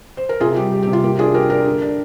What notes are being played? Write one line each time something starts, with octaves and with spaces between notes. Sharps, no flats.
C5
A#4
C3 F4 G#4
G3 G4
G3 G4
G4
C3
F4
A#3 G4
D4 F4 G#4
D4 G4 A#4
D4 G4 A#4
D3
D4